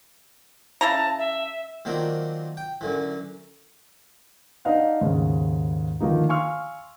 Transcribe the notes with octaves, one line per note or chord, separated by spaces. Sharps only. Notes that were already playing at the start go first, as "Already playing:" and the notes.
C#3 E4 A5 A#5
E5
D#3 F#3 A#3 C4 D4 F4
G5
F#2 D3 E3
D4 D#4 D#5 F5 F#5
D#2 G#2 C#3
D3 D#3 F3 A#3 D#4
F5 G#5 C6 C#6 E6 F6